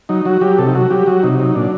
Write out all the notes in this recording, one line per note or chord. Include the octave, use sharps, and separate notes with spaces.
F#3 D#4
F#3 F#4
F#3 G4
C3 A4
D#4
F#3 F#4
F#3 G4
F#3 F#4
C3 D#4
F#3 D#4
A#2 D4